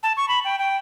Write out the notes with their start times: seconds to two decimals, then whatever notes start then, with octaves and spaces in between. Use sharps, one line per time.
0.03 A5
0.17 C#6
0.28 B5
0.45 G5
0.59 G5